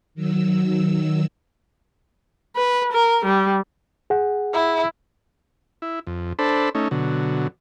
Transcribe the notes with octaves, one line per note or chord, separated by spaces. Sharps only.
D#3 F#3 E6
B4
A#4
G3
G#4 F#5
E4
E4
F2
D4 A4 C5 B5
A3 C#4 D#4
B2 D3 F#3